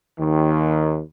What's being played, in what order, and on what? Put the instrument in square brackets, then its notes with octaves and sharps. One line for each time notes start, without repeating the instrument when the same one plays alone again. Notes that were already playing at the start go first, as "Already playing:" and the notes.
[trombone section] D#2 D#3